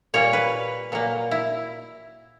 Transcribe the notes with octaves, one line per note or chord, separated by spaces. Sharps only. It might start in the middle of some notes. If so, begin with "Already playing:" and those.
A#2 G3 A#3 C#5
B4
A#2 F#3 A#3
E4